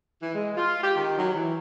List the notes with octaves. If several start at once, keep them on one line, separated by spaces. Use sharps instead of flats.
E3
G#3
F4
G4
D#3
F#3
E3